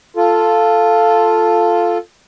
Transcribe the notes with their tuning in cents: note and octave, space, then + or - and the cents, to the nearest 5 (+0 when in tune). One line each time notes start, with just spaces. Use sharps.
F4 +0 A4 +0